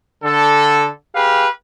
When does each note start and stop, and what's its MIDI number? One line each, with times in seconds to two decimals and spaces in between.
0.24 0.86 50
0.24 0.86 69
1.14 1.47 67
1.14 1.47 68
1.14 1.47 71
1.14 1.47 77